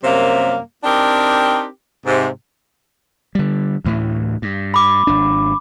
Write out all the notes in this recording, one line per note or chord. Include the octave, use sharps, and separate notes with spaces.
F#2 C3 G3 A#3
C4 D4 D#4 G4 A#4
G#2 C3
D3 G3
D2 A2 E3
G2
B5 D6
G#1 D4